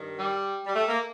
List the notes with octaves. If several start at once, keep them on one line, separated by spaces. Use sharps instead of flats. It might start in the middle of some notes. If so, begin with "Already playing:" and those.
Already playing: G2 D#3
G3
G3
A3
A#3